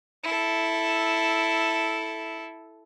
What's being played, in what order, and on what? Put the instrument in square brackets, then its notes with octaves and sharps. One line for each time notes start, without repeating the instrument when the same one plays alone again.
[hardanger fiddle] E4 A4